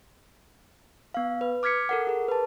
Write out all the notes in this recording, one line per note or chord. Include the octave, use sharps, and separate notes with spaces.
B3 F5
B4
D6 F6 G#6 B6 C#7
A4 A#4 F#5
G#4 A#4
B4 A5